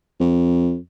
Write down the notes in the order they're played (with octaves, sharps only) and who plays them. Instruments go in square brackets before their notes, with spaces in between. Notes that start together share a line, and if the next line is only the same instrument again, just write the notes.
[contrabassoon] F2